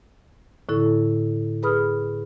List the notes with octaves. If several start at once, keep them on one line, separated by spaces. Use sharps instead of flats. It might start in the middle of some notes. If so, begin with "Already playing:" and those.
A2 D3 E4 A4
G#4 B4 B5 D#6 F6